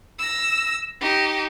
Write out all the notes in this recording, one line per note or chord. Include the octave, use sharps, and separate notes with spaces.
E6 A#6
D#4 G4